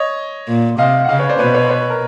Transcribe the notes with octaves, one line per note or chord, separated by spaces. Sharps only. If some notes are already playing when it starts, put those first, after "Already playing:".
Already playing: C#5 D#5
A#2
C3 D#5 F5
F#5
C#3 D#5 F5
B4 C#5
C5 D5
B2 B4 C#5
B4 C#5
C5
B4 C#5
A#4